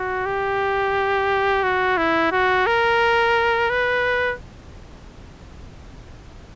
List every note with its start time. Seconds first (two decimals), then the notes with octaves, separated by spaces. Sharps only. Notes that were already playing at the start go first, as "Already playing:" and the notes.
Already playing: F#4
0.26 G4
1.63 F#4
1.97 E4
2.32 F#4
2.67 A#4
3.70 B4